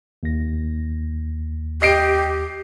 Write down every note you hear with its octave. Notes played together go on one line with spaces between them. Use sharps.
D#2 A#6
G4 D#5 C7 D7